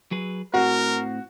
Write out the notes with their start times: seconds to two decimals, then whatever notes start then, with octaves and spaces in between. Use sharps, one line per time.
0.11 F#3 G#4 B4
0.54 A2 C4 F#4 A#4